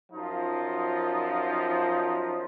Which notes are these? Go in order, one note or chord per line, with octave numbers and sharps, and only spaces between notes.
F#2 F3 D#4 F4